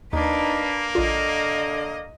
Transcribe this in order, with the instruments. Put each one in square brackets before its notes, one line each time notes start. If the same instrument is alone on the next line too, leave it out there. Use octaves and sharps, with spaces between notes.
[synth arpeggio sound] D#2 [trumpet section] A#3 [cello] D4 B4 [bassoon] D#4
[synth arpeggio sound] A#1 F4 [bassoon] D3 [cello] D#5